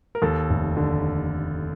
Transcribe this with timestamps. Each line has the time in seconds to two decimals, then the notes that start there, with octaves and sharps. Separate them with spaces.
0.15 A#4
0.22 D#2 A4
0.50 F1
0.77 D3